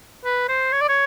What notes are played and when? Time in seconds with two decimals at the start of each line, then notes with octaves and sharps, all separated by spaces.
0.25 B4
0.48 C5
0.72 C#5
0.81 D5
0.89 C#5